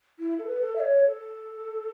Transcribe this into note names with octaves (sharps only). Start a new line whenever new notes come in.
E4
A4
B4
A4
E5
C#5
A4